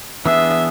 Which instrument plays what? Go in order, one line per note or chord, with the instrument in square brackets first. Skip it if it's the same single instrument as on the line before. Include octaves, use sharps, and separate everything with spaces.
[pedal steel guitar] E3 B3 D4 G#4 [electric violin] E5